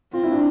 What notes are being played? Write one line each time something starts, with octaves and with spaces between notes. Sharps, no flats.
C4 F4
E4
D4